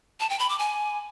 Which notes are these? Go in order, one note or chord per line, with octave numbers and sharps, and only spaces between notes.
A5
G5
B5
D6
G#5